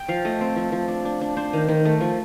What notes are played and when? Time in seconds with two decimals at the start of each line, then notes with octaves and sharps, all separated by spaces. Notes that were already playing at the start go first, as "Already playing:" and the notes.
Already playing: G5
0.08 F3 F5
0.25 A3 D#5
0.41 C4
0.56 F3
0.72 F3
0.88 D4
1.05 D4
1.21 D4
1.37 D4 C5
1.53 D#3
1.68 D#3
1.85 A3
2.01 F3